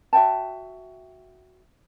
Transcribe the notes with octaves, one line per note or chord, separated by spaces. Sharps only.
F#4 E5 G5 A5